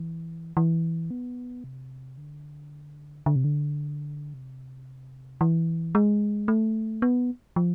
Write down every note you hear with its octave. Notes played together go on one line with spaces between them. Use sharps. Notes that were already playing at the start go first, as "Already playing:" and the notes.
Already playing: E3
E3
B3
C3
D3
D3
C3
D3
C3
E3
G#3
A3
B3
F3